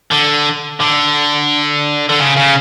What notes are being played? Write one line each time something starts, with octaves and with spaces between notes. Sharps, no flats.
D3
D3
D3
C#3
C#3